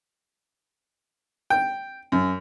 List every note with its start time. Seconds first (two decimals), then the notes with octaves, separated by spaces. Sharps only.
1.50 G5
2.12 F#2